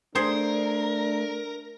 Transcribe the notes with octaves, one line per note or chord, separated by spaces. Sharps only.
A3 D4 G#4 A#4 C5